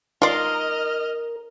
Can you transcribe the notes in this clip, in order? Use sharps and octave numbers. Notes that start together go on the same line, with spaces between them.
D#4 F4 A#4 D5 D#5 C6 F6